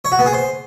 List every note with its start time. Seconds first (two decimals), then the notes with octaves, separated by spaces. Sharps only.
0.05 C#5
0.12 F#4
0.19 B3
0.26 G#4
0.33 C5